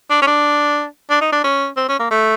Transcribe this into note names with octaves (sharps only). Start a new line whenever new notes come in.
D4
C#4
D4
D4
D#4
D4
C#4
C4
C#4
A#3
A3